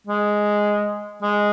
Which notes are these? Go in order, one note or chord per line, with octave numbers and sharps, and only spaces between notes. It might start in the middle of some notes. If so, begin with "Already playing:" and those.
G#3
G#3